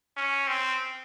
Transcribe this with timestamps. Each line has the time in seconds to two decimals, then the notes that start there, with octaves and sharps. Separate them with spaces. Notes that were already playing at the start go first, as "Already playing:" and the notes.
0.17 C#4
0.48 C4